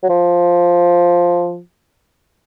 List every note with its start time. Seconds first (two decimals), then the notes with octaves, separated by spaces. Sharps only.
0.03 F#3
0.09 F3